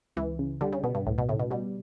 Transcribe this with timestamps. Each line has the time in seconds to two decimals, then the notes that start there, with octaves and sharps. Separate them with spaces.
0.16 C#2 E3
0.39 C#3
0.61 D3 G3
0.73 C#3
0.84 B2 B3
0.95 G2
1.06 C#2 A2
1.18 B2
1.29 A2 C#3
1.39 B2
1.51 B2 G3